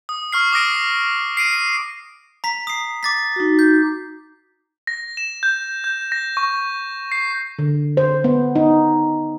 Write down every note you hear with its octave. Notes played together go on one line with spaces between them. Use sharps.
D#6
C#6 F6 C7
D6 D#6 F6 A#6 D7
C7 D7 D#7
A#5 B6
D#6 C7
D6 A6 B6
D#4 F#4
G6
A#6
E7
G6
G6
A#6
C#6
C7
D3
C5
B3
D#4